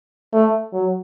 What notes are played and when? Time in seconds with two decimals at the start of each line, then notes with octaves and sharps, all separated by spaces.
0.33 A3
0.73 F#3